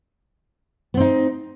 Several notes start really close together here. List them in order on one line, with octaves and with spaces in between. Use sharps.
B3 C4 D#4